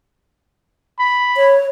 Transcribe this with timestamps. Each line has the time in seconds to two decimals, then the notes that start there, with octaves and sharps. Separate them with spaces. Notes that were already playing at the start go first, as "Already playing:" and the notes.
0.99 B5
1.36 C#5